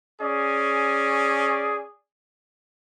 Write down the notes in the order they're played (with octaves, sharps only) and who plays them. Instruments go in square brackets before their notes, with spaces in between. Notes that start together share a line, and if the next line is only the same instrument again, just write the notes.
[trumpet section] C#4 G#4 D5